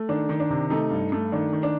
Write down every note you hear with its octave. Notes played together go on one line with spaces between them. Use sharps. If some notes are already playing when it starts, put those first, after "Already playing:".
Already playing: A3
D#3 D4
D#3
D4
C3
A3 D#4
G2
A3
D#3 D4
D#3
D4